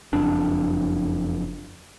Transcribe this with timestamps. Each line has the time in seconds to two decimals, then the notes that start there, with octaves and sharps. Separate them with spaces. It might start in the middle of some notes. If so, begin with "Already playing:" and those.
0.13 F#1 F2 D4